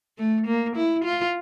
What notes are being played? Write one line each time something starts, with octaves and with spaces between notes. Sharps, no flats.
A3
A#3
E4
F4